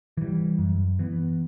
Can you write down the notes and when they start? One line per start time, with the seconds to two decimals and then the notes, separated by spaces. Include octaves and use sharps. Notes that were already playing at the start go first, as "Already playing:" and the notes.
0.17 E3 G3
0.58 F#2
0.99 E3 B3